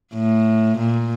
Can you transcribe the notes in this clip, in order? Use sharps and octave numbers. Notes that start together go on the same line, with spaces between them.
A2
A#2